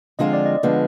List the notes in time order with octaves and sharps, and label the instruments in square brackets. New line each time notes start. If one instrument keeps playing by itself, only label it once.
[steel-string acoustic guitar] D3 F3 G#3 C4 F4 [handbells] D#5
[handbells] D5
D#5
[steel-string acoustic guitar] D3 F3 G#3 B3